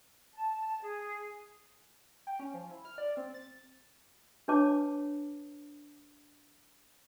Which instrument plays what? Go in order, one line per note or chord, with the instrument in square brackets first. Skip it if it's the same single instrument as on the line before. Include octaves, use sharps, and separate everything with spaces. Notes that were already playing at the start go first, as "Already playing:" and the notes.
[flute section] A5
G#4
[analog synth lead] G5
C#4
F3
E4
F6
D5
C4
A6
[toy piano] D4 B4 C#5 A5 D6